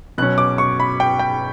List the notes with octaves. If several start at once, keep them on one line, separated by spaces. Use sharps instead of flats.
B2 F#3 C#4 F#6
D6
C#6
B5
G5
G5